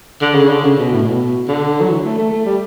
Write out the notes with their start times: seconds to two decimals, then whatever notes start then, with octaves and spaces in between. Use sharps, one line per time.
0.21 D3
0.35 C#3
0.49 D3
0.64 C#3
0.79 B2
0.93 A2
1.06 B2
1.48 D3
1.81 F#3
1.89 E3
2.05 A3
2.18 A3
2.32 A3
2.45 G3